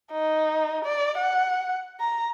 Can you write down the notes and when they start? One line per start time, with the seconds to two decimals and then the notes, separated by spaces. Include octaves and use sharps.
0.12 D#4
0.84 D5
1.18 F#5
2.00 A#5